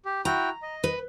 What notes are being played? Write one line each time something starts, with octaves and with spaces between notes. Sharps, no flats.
G4
E4 F#4 G5 A#5
D#5
B4